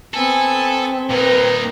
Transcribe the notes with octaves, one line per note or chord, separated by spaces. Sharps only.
B3 C4 A4 G#5
A#2 D#4 A#4 B4